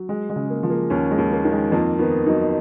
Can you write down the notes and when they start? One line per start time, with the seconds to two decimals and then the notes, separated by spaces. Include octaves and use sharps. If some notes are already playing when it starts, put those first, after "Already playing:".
Already playing: F#3
0.09 G#3
0.30 G#3
0.36 C#3
0.50 A#3
0.63 F3
0.70 A#3
0.90 D#2 C#4
1.11 G#3
1.18 D#2
1.32 A#3
1.45 D#3
1.51 G#3
1.71 F2 A#3
1.99 D#3 B3
2.26 F#3 D#4